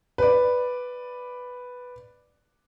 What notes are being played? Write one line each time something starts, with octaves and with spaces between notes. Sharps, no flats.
B4 D5